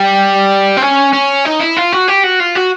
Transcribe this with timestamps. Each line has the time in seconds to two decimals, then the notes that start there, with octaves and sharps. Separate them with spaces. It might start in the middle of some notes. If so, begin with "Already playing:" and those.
Already playing: G3
0.77 C4
0.82 C#4
1.13 C#4
1.45 D#4
1.60 E4
1.77 F4
1.92 F#4
2.08 G4
2.23 F#4
2.40 F4
2.55 F#4